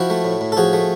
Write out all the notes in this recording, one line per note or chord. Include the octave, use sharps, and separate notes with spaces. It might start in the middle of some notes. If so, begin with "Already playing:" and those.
Already playing: F3 E4 F#4
A3
A2
A2
A4
F3 F#4 G#4
A3